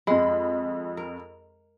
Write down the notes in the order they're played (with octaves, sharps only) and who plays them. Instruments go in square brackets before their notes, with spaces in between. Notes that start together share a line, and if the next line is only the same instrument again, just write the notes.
[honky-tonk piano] F2 B5 [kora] G#3
[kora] A#4